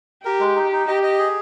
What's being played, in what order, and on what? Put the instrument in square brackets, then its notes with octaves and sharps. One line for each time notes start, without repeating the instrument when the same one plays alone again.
[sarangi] G4 [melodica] A#4
[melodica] G#3
D#4
D#4
[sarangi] G4 [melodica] D#5
[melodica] D#5
G#4